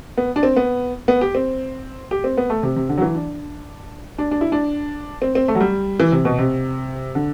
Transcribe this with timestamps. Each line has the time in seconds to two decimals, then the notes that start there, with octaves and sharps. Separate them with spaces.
0.18 B3
0.36 D4
0.43 C4
0.56 B3
1.08 B3
1.21 G4
1.35 C4
2.11 G4
2.24 C4
2.37 B3
2.50 A3
2.63 C3
2.76 C3
2.89 D3
2.98 F#3
3.02 E3
3.15 D4
4.18 D4
4.31 D4
4.41 E4
4.52 D4
5.22 C4
5.35 C4
5.48 A3
5.55 F#3
5.61 G3
6.00 E3
6.12 C3
6.25 B2
6.39 C3
7.15 D3